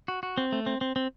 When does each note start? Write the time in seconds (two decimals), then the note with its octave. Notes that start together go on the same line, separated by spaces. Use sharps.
0.08 F#4
0.23 F#4
0.38 C4
0.52 A3
0.66 C4
0.81 C4
0.96 C4